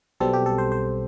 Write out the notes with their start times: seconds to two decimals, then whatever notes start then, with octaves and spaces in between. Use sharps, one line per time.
0.20 B1 B2 G3 C4 A4
0.33 G4
0.46 A4
0.58 C5
0.72 C5